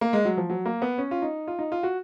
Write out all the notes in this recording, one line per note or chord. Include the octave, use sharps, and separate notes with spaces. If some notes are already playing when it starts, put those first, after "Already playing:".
A#3
G#3
F#3
F3
F#3
A#3
B3
C#4
F4
D#4
F4
D#4
F4
F#4